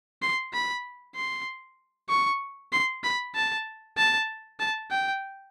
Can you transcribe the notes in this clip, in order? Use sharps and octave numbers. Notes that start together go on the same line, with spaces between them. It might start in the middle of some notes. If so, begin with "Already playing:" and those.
C6
B5
C6
C#6
C6
B5
A5
A5
A5
G5